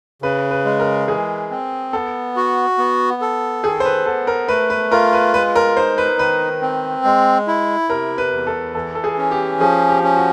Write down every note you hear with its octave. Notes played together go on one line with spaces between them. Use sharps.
C#3 B4
B4
G#3
A#4
E3 G#4
C4
B3 A4
F#4
B3
A4
D#3 G#4
C5
B4
B3 A4
A#4
A3 B4
B4
F4 A#4
B4
G#3 B4
A#4
D#4 C5
B4
D#3 B4
C4
G#3
E4
C3 A#4
B4
E2
A4
E3 A4
A4
G#4
C#4
G4
F3 G#4
G4
C#4
F#4